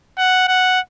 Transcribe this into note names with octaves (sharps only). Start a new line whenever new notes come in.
F#5
F#5